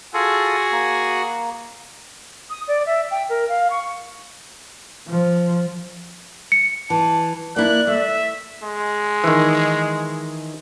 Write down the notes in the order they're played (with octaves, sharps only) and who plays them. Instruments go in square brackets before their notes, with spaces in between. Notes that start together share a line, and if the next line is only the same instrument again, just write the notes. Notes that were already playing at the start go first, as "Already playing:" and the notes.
[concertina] F4 A4 [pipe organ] F#4 G#4
[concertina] A#3
[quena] D#6
D5
E5
G5
A#4
F5
C#6
[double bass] F3
[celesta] C#7
[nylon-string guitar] E3 [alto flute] A5
[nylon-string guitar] A#3 E4 [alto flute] D5 [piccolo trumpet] F#6
[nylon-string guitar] A3 [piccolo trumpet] E5
[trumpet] G#3
[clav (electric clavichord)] D#3 E3